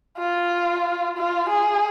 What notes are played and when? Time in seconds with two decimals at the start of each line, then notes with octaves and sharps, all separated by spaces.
0.18 F4
1.17 F4
1.49 G#4